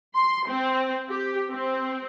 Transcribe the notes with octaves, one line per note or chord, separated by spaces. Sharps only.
C6
C4
G4
C4